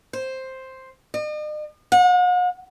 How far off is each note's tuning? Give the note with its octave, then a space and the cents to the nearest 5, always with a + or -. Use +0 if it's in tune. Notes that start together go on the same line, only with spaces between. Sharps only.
C5 +5
D#5 -45
F#5 -45